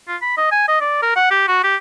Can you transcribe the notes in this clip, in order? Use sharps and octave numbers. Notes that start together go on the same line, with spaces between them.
F4
B5
D#5
G#5
D#5
D5
A#4
F#5
G4
F#4
G4